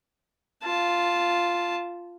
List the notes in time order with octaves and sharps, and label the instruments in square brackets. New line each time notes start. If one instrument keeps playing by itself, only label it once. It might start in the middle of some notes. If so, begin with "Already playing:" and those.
[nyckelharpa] F4 A5